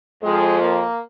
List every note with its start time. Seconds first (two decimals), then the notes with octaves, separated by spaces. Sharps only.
0.22 F2 F3 G#3
0.60 A#3